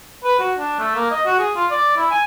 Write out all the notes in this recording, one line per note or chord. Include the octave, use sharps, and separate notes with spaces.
B4
F#4
D4
A3
A#3
D#5
F#4
G#4
F4
D5
E4
G#5